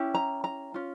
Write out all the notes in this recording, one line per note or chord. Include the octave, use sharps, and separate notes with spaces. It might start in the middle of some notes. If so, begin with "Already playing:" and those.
Already playing: C#4 E4 G4
A#5
A#5
C#4 F4